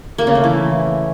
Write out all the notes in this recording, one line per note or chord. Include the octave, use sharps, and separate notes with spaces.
A#3
C#3
A3
E3